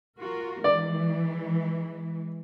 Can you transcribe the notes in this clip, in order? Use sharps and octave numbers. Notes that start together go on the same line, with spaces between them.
F4 F#4 A#4
E3 G#3 D5